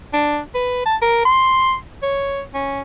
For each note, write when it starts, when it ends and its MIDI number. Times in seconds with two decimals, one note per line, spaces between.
0.13 0.39 62
0.55 0.82 71
0.86 0.96 81
1.02 1.23 70
1.25 1.74 84
2.02 2.42 73
2.54 2.81 61